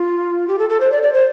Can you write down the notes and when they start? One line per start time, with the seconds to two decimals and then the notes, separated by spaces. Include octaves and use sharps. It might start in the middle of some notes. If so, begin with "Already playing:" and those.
Already playing: F4
0.48 G4
0.59 A4
0.69 A4
0.80 C5
0.92 D5
1.03 D5
1.13 C5